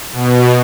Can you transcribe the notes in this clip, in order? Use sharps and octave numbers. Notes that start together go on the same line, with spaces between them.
B2